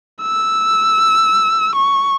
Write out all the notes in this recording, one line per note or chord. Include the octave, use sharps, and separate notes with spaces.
E6
C#6